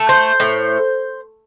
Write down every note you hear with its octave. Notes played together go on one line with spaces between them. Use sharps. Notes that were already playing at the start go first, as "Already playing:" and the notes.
Already playing: A3
C5
A2